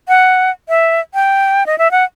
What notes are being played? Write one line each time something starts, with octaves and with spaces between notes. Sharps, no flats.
F#5
E5
G5
D#5
E5
F#5